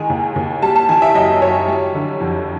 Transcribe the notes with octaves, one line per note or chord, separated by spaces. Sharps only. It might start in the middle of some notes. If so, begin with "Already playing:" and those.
Already playing: D#3 G#3 G#5
D#2
D#2
G3 A5
A5
D#3 G#5
E5
F#2 D#5
F#2 C#5
G3
D3
F2